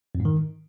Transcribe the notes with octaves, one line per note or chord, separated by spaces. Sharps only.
F2
G#2
D#3